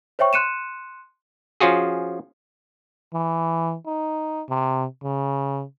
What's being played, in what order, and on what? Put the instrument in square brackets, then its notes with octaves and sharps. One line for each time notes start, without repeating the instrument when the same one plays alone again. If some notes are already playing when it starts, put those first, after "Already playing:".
[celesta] C5 C#5 E5 G5 C#6
C6 F#6 C#7 D#7 E7
[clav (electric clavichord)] F3 C#4 F4 F#4 G#4
[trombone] E3
D#4
C3
C#3